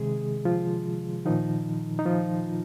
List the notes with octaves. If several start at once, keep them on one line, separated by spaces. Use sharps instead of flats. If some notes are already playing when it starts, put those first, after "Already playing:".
Already playing: C3 D#3 G#3 G#4
F3 F4
A#2 D#3 F3 D#4
D#4
F3 F4